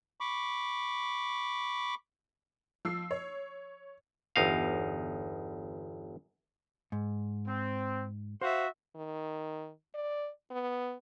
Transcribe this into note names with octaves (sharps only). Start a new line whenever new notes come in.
B5 C#6 D6
F3 E6 C7
C#5
G1 E2 D#4 F5
G#2
C4
F#4 C5 E5 F5
D#3
D5
B3